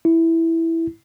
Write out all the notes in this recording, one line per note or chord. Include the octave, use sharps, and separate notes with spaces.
E4